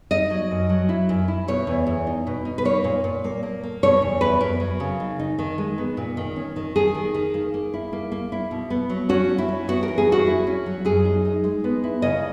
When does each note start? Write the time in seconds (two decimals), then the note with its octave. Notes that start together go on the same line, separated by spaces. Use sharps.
0.11 D#4 D#5
0.30 F#3
0.51 F#2
0.69 F#3
0.89 E4
1.09 F#2
1.28 E4
1.48 B2 C#5
1.67 E2
1.87 E2
2.07 D#4
2.27 B2
2.45 D#4
2.58 B4
2.65 A#3 C#5
2.84 A#2
3.04 A#2
3.24 A#3
3.43 A#3
3.63 A#3
3.83 B2 C#5
4.02 E2
4.21 E2 B4
4.41 F#2 A#4
4.60 F#3
4.80 C#3
5.00 D#4
5.19 D#4
5.39 D#3
5.58 G#3
5.78 B3
5.97 A#2
6.17 D#3
6.36 C#4
6.56 D#3
6.75 D#3 G#4
6.95 D#3
7.14 D#3
7.34 A#3
7.54 A#3
7.74 E4
7.93 A#3
8.12 A#3
8.32 E4
8.51 B2
8.70 B3
8.90 F#3
9.09 C#4 F#4
9.30 C#4
9.38 E4
9.48 C#4
9.68 B3 F#4
9.83 A#4
9.88 E3
9.98 G#4
10.07 F#2
10.12 F#4
10.27 E4
10.47 C#4
10.66 F#3
10.85 F#2 G#4
11.05 D#4
11.25 D#4
11.44 G#3
11.64 B3
11.84 E4
12.02 C#3 D#5